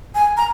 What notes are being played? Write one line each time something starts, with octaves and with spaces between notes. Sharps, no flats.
G#5
A#5